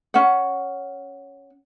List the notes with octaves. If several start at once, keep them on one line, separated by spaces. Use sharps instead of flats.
C#4 F#5